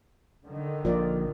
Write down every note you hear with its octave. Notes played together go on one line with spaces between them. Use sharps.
D3 D#3
A#1 F4 A#4 D5